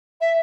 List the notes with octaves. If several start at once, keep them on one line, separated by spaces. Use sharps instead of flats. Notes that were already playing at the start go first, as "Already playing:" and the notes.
E5